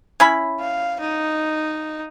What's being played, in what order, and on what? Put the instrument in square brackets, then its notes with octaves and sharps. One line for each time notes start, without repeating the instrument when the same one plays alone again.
[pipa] C#4 E4 B5
[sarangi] F5
D#4